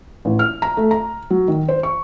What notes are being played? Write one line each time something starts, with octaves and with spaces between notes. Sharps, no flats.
A1
F6
A#5
A3
A#5
F#3
D#3
C5
C#6